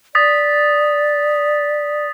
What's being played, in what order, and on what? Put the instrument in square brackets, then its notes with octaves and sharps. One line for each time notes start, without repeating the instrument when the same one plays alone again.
[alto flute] D5 [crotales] D#6 A6 B6